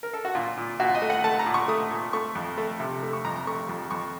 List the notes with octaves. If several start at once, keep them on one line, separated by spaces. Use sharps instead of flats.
A#4
A4
F#4
A#2 F4
A#2
A#2 F#4
D#5
A3
F#5
A3 A5
A#5
A#2
C#6
A3 D#6
A#2
A3 C#6
F2
A3
C3
A3
C#6
F2 A#5
A#5
A3 C#6
F2
F2 C#6